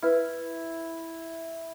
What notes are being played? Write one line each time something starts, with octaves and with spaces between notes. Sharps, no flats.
E4 B4 F6